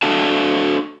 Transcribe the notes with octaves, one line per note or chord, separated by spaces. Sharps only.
D4 F#4 A4 F5 A5